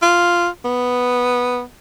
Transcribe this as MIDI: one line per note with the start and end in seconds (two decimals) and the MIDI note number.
0.02 0.48 65
0.65 1.62 59